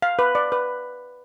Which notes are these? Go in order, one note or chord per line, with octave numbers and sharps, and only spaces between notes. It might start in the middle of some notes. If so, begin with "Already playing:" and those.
F5
B4
D5
B4